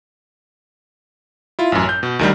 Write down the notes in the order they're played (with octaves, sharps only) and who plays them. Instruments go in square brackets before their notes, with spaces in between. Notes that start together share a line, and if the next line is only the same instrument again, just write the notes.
[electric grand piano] E4 F4
A1 F#2
G6
B2
D2 D#3 G3